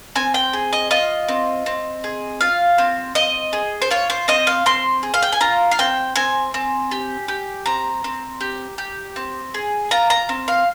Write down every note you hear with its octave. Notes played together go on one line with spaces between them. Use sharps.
C4 G#5
G5
G#4
D#5
F4 D#5
C4
C4
G#4
F4 F5
C4
C4 D#5
G#4
C5
F4 C#5
C5
C4 D#5
F5
C4 C6
G#4
F5
G5
G#5
F4 A#5
F5
C4 G5
C4 G#5
C4
G4
G4
C4 A#5
C4
G4
G4
C4
G#4
F4 A#5
A#5
C4
F5